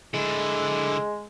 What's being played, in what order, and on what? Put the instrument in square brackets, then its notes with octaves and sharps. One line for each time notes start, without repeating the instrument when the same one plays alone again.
[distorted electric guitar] D3 E4 [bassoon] G#3